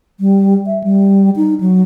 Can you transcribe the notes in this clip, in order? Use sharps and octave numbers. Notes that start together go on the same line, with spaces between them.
G3
E5
G3
D#4
F#3